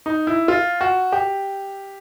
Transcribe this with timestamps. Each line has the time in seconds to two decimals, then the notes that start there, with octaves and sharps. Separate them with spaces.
0.06 D#4
0.27 E4
0.48 F4
0.81 F#4
1.12 G4